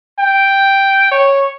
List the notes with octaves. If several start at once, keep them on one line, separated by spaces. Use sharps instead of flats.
G5
C#5